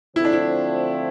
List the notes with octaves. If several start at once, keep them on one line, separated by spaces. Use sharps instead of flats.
D3 F3 A3 C4 E4 F4
D4
E4